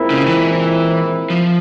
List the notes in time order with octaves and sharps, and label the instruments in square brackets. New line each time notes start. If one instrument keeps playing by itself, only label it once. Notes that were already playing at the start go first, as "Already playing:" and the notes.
Already playing: [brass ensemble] A#2 G#3 C4 E4 A#4
[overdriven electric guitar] C#3
E3
F3